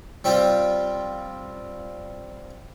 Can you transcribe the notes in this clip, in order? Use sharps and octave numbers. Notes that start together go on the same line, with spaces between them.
G3 C4 F4 G4